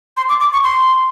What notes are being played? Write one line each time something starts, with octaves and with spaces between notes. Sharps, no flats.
C6
D6
D6
C#6
C6